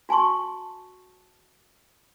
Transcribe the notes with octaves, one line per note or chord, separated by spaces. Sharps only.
F#4 G#5 A5 C6 C#6